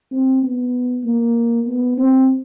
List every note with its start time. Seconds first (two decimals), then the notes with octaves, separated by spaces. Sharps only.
0.11 C4
0.42 B3
1.04 A#3
1.67 B3
1.97 C4